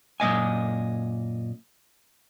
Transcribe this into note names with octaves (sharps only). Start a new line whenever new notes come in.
F#2 A#2 D#5 G#5